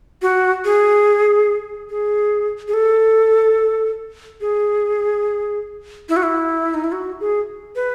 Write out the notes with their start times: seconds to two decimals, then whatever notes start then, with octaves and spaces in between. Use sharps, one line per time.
0.22 F#4
0.65 G#4
1.90 G#4
2.68 G#4
2.74 A4
4.41 G#4
6.09 E4
6.16 F#4
6.23 E4
6.74 D#4
6.84 E4
6.92 F#4
7.20 G#4
7.76 B4